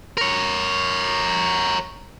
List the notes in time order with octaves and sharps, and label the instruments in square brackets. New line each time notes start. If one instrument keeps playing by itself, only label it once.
[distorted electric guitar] A#4 C#5